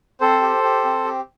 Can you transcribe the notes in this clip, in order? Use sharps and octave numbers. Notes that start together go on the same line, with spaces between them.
C4 A4 C5
G4
G4
C4
G4